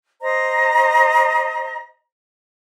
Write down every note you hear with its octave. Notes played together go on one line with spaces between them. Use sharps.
C5 D#5 A#5